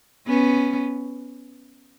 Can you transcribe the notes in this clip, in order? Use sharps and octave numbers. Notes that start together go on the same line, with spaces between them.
B3 C#4